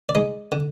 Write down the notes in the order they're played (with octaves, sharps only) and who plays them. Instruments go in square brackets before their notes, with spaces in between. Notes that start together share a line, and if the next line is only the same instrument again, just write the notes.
[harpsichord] D5
G#3 D#4 D#5
D3